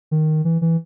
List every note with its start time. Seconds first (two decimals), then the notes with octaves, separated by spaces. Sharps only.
0.11 D#3
0.45 E3
0.61 E3